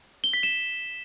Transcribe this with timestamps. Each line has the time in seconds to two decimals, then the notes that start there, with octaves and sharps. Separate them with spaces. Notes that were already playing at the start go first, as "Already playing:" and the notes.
0.24 G7
0.33 B6
0.43 E7